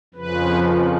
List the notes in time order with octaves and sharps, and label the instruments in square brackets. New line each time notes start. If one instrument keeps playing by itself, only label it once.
[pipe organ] F2 C#3 F3 B4